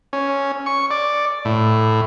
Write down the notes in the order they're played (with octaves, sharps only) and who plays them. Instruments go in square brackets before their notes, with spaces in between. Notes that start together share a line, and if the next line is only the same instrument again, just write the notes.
[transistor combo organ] C#4
C#6
D5
A2